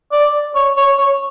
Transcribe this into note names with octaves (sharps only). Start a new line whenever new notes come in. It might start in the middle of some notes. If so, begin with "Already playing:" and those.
D5
C#5
C#5
C#5